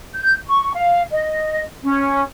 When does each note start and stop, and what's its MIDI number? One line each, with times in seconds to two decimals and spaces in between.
0.14 0.35 91
0.48 0.71 85
0.73 1.02 77
1.11 1.64 75
1.82 2.23 61